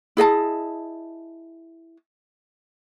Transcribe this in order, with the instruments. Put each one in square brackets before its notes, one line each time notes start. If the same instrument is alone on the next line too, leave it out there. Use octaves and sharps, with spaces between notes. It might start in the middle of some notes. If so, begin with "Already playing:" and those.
[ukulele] E4 G#4 D#5 A5